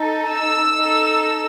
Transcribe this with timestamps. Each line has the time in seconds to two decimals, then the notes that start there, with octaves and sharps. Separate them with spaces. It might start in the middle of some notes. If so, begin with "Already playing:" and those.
Already playing: D#4 A4
0.31 E6
0.75 D#4 A4